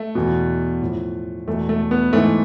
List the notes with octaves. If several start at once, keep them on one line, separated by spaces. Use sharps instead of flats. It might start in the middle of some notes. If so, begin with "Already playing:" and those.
Already playing: A3
E2 B2
A2 F3
E2 B2 A3
A3
B3
G#2 E3 A3